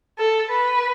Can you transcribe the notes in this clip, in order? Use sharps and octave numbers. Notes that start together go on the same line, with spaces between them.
A4
B4